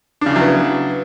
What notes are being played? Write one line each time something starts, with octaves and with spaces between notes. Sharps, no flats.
C#3 F#3 B3 D4 E4